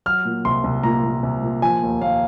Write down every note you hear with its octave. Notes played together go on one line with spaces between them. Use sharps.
F#3 F6
A#2
C2 C6
C2
A#2 A#5
A#2
C2
A#2
F3 G#5
D#2
D#2 F5